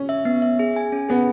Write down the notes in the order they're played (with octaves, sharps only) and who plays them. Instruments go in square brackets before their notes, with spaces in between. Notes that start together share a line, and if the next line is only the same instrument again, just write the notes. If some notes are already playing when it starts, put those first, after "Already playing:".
Already playing: [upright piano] C#4
[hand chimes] E5
B3
E5
G#4
G#5
C#4
[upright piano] B3 [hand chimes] G#4